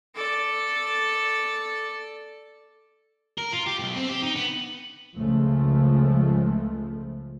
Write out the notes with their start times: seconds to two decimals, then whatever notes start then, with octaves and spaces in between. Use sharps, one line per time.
0.15 A4 D5
3.38 A#4
3.52 F4
3.66 G4
3.79 B1
3.96 C4
4.09 G4
4.23 D#4
4.36 B3
5.17 C#2 C#3 F3 G#3 A3